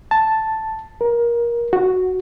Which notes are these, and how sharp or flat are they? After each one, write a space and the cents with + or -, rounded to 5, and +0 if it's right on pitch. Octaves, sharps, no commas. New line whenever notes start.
A5 +0
A#4 +20
F#4 +0